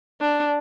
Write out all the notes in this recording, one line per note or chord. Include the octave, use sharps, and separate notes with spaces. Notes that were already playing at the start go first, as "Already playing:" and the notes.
D4